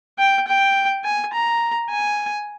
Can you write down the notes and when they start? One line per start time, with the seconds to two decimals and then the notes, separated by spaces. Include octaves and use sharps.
0.19 G5
0.47 G5
1.04 G#5
1.33 A#5
1.90 G#5